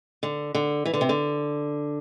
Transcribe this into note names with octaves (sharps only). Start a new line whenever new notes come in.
D3
D3
E3
D3
C3
D3